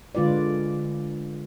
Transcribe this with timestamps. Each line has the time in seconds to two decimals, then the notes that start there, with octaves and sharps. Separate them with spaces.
0.15 D3 G#3 F4 B4 D5